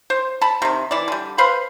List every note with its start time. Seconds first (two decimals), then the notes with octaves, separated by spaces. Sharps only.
0.10 C5
0.41 A5 B5
0.62 C3 D#3
0.91 E3 D5
1.08 D3 G3
1.38 B4 C5 F5 B5